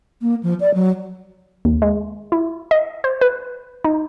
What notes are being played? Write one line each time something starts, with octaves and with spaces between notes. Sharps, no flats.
A#3
F3
D5
F#3
D#2
G#3
E4
D#5
C5
B4
D#4